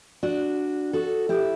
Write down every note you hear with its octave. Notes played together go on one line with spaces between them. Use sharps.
D4 F#4
F#4 A4
E4 G4